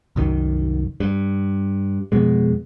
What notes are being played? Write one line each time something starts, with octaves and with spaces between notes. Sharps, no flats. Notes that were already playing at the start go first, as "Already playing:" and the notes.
C2 F#2 D#3
G2
F2 B2 G#3